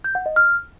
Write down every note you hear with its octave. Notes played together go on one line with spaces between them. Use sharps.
G6
F#5
D#5
F6